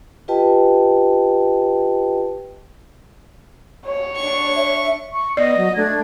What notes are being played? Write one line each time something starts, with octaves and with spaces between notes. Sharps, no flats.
F4 G4 B4 D#5 G5 A5
C#5
D4 C#6
E5
C#6
B3 D5 D#5
F#3
A3 D4 G#6